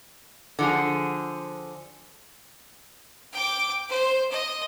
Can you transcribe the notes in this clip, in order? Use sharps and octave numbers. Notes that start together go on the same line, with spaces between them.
D3 F3 G#4
G5 D6
C5
D#5